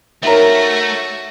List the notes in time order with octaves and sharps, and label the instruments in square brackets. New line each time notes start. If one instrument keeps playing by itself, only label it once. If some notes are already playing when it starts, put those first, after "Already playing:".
[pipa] D#3 A#4 [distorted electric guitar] A3 [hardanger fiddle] F#4 [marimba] C#5 E5